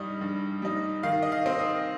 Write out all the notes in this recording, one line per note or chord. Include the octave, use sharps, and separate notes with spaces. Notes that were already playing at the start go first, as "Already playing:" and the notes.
Already playing: G2 G3 D#4 D#6
G2
G3 D#4
D#3 F5
D#5
F5
C4 D#4
D#6